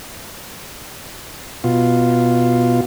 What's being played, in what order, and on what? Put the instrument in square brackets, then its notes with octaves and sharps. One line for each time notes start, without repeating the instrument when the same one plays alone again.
[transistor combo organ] B2 F4